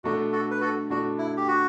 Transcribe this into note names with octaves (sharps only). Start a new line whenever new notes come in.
B2 A3 D4 F#4
F#4 A4
B4
F#4 A4
B2 A3 D4 F#4
E4
G4
F#4